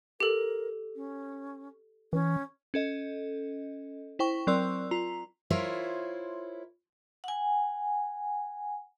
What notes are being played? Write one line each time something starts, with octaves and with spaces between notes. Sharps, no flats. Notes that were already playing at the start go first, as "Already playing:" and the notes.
G4 A4 A#4
C#4
E3 C#4
C#4 A4 D#5
E4 C5 G5 C#6
F#3 C4 A#4 D5 C6 E6
F4 A#5
E4 F4 A#4 C5 C#5 E5
F#5 G#5